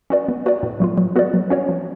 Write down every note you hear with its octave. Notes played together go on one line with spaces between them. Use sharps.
C#4 F#4 B4 D5
B3
F#4 B4 D5
A2
F#3 A3 F4
F#3
B3 F#4 B4 D5
F#3
C#4 F#4 C#5
F3